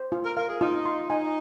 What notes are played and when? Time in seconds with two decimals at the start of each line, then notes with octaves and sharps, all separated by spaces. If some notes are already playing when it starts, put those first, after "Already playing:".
Already playing: C5
0.12 F4
0.24 A#4
0.37 A#4 F5
0.49 G#4
0.61 D#4 F4
0.85 C6
1.10 D#4 G#5